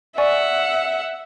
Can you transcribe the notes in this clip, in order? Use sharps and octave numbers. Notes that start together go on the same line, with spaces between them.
D5 E5 F#5 G#5 C#6